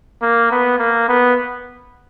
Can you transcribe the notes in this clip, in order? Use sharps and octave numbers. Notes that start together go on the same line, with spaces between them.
A#3
B3
A#3
B3